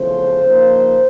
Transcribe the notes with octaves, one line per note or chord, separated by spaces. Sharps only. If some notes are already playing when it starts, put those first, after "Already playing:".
Already playing: E2 C#3 F3 A3 C4 C5
C#3 F3 A#3 D#4